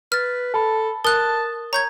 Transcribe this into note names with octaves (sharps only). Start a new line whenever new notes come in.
B4 F6 A6
A4 A5 B5
A#4 A5 D#6 F#6
C#5 A#5 G6 G#6